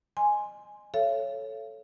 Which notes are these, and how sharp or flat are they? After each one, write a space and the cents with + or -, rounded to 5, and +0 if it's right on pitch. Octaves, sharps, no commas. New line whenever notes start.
D#5 -30 G#5 +0 C6 +0
A4 +0 C#5 +0 F5 -45